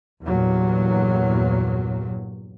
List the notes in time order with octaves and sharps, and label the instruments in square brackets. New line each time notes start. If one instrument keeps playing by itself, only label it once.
[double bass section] E2 G2 A#2 F#3